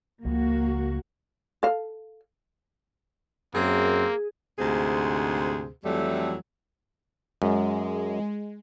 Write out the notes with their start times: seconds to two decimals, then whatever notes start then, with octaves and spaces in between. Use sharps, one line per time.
0.25 C#2 C#3 F3 A#3 F#4
1.63 A4 F5
3.55 F#2 A#3 C4 G#4
4.59 D2 G#2 C3 G#4 C5
5.85 F2 E3 F#3 G3 A3
7.42 F#2 G#3